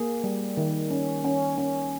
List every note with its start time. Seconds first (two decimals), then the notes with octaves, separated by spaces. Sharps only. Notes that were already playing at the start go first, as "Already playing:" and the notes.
Already playing: A#3 G#4
0.24 G3
0.57 D#3
0.91 C#4
1.24 C#4
1.58 C#4